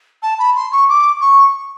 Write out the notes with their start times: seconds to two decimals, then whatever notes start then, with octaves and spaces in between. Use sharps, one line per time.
0.22 A5
0.39 B5
0.55 C6
0.72 C#6
0.89 D6
1.21 C#6